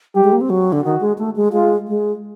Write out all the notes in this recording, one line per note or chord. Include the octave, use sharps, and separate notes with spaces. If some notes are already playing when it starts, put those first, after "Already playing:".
G3 G4
G#3
A#3
C4
F#3
D3
D#3 F#4
G#3
A3
G#3
G#3 F4
G#3